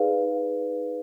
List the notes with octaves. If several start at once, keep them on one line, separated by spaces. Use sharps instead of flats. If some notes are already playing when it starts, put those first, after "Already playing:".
Already playing: D#4 G#4 B4 D5 F5